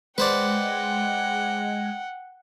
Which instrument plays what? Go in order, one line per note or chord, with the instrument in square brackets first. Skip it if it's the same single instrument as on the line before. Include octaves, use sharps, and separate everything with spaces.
[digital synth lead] G#3 [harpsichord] B4 C5 D5 [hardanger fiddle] F#5 G5